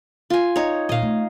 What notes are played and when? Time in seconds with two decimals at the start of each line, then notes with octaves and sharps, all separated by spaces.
0.30 F4 G#5
0.56 D#4 C#5
0.89 A#2 D#5 F5
1.02 A3